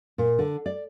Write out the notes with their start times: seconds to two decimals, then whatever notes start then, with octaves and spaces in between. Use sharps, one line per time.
0.18 A#2
0.39 D3
0.66 D5